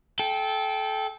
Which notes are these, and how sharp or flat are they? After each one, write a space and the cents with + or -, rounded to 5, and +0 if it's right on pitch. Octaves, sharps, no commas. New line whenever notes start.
A4 -25 G5 +0